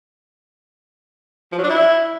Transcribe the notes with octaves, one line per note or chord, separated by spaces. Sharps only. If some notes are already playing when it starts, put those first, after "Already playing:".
F3
F#3
D4
E4